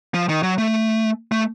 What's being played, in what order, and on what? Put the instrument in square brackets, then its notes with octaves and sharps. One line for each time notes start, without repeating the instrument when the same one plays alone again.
[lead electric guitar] F3
D#3
F#3
A3
A3